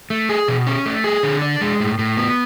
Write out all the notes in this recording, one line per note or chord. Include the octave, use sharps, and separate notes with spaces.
A3
G#4
B2
C#4
A3
G#4
D3
D4
G#3
A2
A2
B3